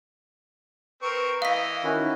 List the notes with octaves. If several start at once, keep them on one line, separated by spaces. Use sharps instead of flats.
C4 A#4 B4 C#6
E3 D#5 F5 B6
D#3 C#4 E4 F#4